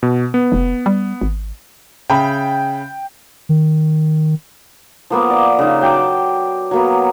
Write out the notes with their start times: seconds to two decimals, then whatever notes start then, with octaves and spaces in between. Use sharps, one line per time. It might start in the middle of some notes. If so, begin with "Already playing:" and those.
0.03 B2
0.34 B3
0.52 F1
0.86 G3
1.21 G#1
2.10 C#3 E5 G5 B5
3.49 D#3
5.10 F3 A#3 B3
5.30 D5 A#5
5.59 C#3 D#4
5.81 F#3 G5 A5 D6
6.71 F#3 A#3 B3